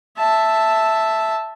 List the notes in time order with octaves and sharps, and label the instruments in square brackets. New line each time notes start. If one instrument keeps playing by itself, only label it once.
[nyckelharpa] E5 A5